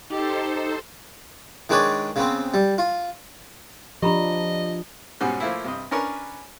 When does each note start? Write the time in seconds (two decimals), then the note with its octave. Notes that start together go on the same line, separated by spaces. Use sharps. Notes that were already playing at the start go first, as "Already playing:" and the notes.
0.10 D#4 G4 A4 C5
1.69 D#3 G#3 D4 B4 C#5 D5
2.16 C#3 B3 C4
2.54 G3
2.78 F4
4.02 F3 D4 G4 D#5 A#5 B5
5.20 G#2 B2 G3 C#4 F#4
5.40 F3 A3 A#3 E4
5.64 G2 C3 D#5
5.91 C#4 D4 A#4 B4 C#5